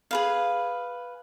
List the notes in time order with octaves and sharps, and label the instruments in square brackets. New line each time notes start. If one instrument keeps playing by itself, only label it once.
[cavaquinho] G#4 B4 F5